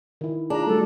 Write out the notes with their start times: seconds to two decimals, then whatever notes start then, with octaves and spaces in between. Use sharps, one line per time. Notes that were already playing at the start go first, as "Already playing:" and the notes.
0.21 D#3 E4
0.50 D4 F4 G#4 A#5
0.67 F#3 G3 A3 A4